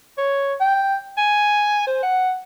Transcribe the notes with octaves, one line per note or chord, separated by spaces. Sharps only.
C#5
G5
G#5
C5
F#5